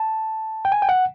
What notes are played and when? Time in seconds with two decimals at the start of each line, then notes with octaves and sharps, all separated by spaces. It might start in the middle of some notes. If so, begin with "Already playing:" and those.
Already playing: A5
0.65 G5
0.72 G#5
0.82 G5
0.89 F#5